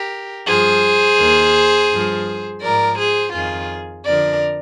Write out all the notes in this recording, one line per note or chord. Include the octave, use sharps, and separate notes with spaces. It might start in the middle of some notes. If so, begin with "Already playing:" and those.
Already playing: G4 A#4
G2 F3 G#4 C5
D#2 D#3
G2 F3
G#2 F3 A#4 D5
G#4 C5
F2 D#3 F4 G#4
F2 D3 F3 A#4 D5